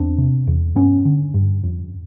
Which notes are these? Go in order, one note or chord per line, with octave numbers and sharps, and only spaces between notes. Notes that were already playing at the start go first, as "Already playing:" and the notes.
Already playing: E2 C4 D4
C3
E2
G2 B3 C#4
D3
G2
F2